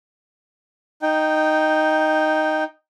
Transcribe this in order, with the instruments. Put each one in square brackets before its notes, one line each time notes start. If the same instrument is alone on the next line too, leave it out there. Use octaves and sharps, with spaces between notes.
[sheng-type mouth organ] D#4 G5